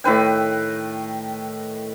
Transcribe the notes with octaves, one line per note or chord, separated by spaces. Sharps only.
A2 D#3 B4 G5